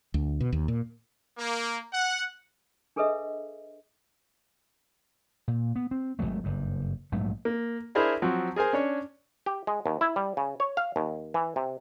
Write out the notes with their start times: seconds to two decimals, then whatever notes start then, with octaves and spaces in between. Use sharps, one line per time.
0.14 D2
0.40 B2
0.53 D#2
0.68 A#2
1.39 A#3
1.94 F#5
2.96 D4 G#4 A4 B4 D#5 E5
5.48 A#2
5.76 B3
5.91 C4
6.19 G#1 F2 F#3 A3
6.44 F#1 G2
7.12 A#1 G#2 F#3 A3
7.45 A#3
7.95 D4 E4 G#4 A#4 C5 E5
8.22 F3 F#3 C4
8.56 G#4 A#4 C5 G#5
8.73 C#4 D4 C#5
9.46 G4
9.67 G#3
9.86 D#2
10.01 E4
10.16 G3
10.37 C#3
10.60 C#5
10.77 F5
10.96 D#2
11.34 E3
11.56 C3